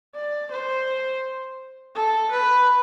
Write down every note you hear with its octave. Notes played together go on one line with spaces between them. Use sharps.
D5
C5
A4
B4